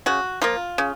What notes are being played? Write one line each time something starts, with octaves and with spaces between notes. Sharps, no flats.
C#3 F#4
F3 A#3 F4
C#3